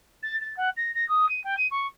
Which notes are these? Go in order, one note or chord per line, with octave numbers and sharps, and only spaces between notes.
A6
A6
F#5
A#6
A#6
D#6
D#7
G5
D#7
C#6